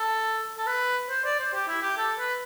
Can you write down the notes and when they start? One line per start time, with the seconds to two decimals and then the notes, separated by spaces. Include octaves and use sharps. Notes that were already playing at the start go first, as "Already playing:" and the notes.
Already playing: A4
0.58 A4
0.67 B4
1.09 C5
1.24 D5
1.39 C5
1.54 G4
1.68 E4
1.82 G4
1.97 A4
2.19 B4